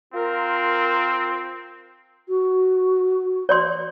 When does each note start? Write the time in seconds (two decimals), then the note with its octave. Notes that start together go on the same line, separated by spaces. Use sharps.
0.14 C4 F4 A#4
2.29 F#4
3.49 C#5 D5 C6